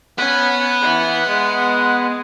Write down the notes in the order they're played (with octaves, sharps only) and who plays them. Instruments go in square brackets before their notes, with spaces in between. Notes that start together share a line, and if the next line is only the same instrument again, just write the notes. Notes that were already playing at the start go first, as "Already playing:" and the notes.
[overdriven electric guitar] B3 B4 [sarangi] C#4 [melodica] F#5
[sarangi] E3
G#3